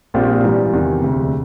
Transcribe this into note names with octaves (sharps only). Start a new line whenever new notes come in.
A#1 A#2 G3 C4 F4
G#2 E3 G3
E2 C3 D#3
E1 D2 C3